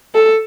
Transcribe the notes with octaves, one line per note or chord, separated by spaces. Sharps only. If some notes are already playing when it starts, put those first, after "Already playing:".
A4